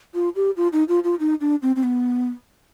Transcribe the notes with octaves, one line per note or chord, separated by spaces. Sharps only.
F4
G4
F4
D#4
F4
F4
D#4
D4
C4
C4
B3